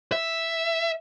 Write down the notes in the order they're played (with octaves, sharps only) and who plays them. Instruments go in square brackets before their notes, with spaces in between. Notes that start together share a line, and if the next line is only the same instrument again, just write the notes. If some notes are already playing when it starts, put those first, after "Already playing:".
[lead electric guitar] E5